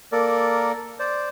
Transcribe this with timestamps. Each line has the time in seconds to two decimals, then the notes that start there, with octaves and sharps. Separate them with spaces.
0.12 A#3 A4 A#4 D5
0.99 C5 D5